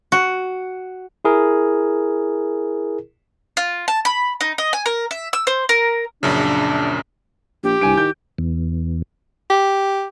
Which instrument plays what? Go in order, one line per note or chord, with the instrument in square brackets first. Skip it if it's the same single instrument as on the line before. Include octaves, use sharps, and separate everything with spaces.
[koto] F#4
[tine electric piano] E4 G#4 A#4
[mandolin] F4
A5
B5
D#4
D#5
G#5
A#4
E5
E6
C5
A#4
[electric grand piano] A#1 F#2 C#3 [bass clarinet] D4
[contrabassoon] A#1 [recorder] G4
[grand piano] C2 G#5 D7 [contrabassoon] G2
[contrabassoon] D#3 [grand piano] G6
[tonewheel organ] E2
[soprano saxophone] G4